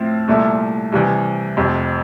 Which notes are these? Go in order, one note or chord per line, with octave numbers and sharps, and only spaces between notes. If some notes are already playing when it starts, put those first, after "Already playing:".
Already playing: A2 F3 C4 E4
C2 A#2 A3 E4
C2 C3 E3
F1 F2 C3